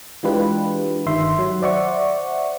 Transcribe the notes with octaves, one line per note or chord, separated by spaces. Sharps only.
E3 G#3 D4 F4 G4 B4
G1 D#3 E5 C6
F#3
C5 D5 E5 F#5 C#6